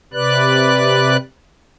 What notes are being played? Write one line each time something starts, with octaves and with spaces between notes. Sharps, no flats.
C3 B4 D5 F#6